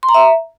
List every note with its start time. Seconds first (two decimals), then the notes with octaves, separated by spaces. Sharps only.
0.03 C6
0.09 A#5
0.14 E5